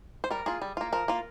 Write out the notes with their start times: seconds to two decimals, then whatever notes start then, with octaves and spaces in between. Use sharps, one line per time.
0.24 C5
0.31 G3 A#4
0.46 A#3 F4 G#4
0.62 G3
0.77 A#3 F4
0.93 F3 A#4
1.08 A#3 F4